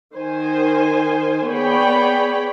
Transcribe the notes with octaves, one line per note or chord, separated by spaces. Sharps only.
D#3 C5 G#5
B3 G#4 C#5 D5 G5 B5